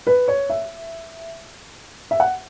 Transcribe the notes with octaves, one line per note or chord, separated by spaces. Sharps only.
B4
C#5
E5
E5
F#5